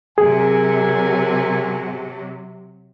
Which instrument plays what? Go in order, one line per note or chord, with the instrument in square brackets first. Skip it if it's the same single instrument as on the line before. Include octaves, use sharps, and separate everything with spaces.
[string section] C3 F#3 [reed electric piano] G#4 [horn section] A#4 E5 G#5